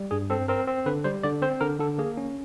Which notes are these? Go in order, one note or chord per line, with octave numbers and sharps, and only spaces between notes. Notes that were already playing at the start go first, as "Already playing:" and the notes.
Already playing: G3
G2 G#4
C4 A4
C4 A#4
C4
D3 B4
G3 C5
D3 D5
C4 C5
D3 A#4
D3 A4
A#3 G#4
C#4